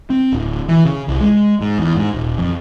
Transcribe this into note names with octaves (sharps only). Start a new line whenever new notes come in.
C4
D1
E3
C#3
C2
G#3
G#2
E2
G#2
D#1
F2